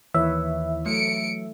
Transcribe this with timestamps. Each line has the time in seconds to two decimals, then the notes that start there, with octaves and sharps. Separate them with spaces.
0.14 D#2 D#3 E3 B4 C#5 E5
0.86 F#3 A3 C#7 D7